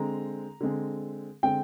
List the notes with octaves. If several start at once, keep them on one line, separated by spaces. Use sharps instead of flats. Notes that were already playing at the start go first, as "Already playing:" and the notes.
Already playing: D3 G#3 C4 A#5
D3 G#3 C4
D3 G#3 C4 G5